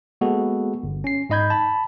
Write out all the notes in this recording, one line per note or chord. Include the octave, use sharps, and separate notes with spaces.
G#3 A#3 B3 F#4 G#4 A4
G1
C#4 C7
G#2 D#4 D#5 B5 G6 G#6
A5 B5